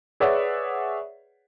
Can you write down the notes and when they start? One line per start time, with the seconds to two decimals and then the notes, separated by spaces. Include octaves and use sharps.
0.20 G#4 B4 C#5 D5 E5 F#5